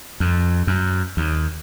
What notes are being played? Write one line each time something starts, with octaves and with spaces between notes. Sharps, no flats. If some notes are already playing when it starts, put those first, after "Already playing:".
F2
F#2
D#2